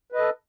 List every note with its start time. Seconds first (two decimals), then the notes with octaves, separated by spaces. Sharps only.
0.12 B4
0.15 D#5
0.18 A4